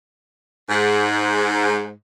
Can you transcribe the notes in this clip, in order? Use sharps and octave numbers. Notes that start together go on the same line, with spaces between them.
G#2